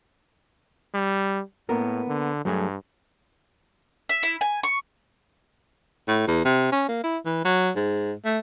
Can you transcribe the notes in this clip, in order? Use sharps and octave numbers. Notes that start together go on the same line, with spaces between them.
G3
A2 A#3 B3 A#4
D3
G2 F#3 A3 G#4
E5
E4
G#5
C#6
A2
E2
C3
C#4
A#3
E4
E3
F#3
G#2
A3